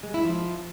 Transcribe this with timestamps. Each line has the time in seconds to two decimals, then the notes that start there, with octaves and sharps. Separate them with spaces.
0.03 G#3
0.14 E4
0.25 F3